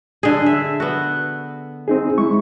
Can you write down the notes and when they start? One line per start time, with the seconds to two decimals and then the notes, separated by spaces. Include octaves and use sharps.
0.23 D3 G#4
0.46 E5
0.80 B3 F#4
1.88 C4 D#4 G#4
2.18 G#3 E4 C#6